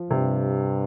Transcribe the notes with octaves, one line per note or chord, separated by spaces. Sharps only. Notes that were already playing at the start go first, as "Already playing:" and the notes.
Already playing: F3
G2 C3